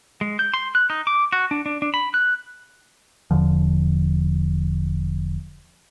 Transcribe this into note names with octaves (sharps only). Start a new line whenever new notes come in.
G#3
G6
C6
F#6
D#4
D6
F#4
D4
D4
D4
B5
F#6
E1 E2 D3 F3